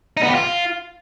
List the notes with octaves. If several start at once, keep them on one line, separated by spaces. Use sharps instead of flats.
D#4
B3
G4
F4